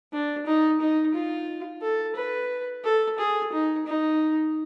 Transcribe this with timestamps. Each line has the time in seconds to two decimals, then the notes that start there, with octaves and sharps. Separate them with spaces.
0.13 D4
0.47 D#4
0.81 D#4
1.15 F4
1.82 A4
2.16 B4
2.85 A4
3.19 G#4
3.53 D#4
3.86 D#4